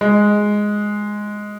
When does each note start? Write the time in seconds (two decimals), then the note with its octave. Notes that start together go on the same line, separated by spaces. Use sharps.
0.01 G#3